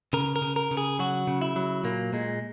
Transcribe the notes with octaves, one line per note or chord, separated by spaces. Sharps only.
C#3 A#4
A#4
C#3
A#4
C#3
G#4
F#3 F#4
C#3
E4
F#3
A#2 A#3
A#2 G#3